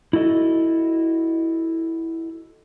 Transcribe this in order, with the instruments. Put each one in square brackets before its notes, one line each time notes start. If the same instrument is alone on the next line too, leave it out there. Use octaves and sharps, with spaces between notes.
[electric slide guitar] E4 F#4 A4 D#5